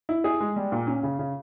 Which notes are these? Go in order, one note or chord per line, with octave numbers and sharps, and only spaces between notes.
E4
G#4
G#3
G3
A#2
C#4
C#3
C#3